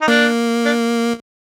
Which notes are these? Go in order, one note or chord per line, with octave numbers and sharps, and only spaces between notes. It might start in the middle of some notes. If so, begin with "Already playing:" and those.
D#4
A#3 D4
D4